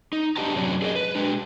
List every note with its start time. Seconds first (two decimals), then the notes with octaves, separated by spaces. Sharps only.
0.13 D#4
0.36 D4 G4 D#5 F#5 A5 A#5
0.56 F#2 C3 F#3 C#4 D4
0.82 G#4 A#4 D5 D#5
0.96 B4
1.15 G#3 D4